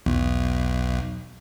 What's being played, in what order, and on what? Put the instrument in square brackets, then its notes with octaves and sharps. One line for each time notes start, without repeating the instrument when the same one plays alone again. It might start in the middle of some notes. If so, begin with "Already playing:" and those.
[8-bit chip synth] B1 [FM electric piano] E2